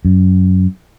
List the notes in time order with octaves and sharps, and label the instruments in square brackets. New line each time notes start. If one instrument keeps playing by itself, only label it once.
[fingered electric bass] F#2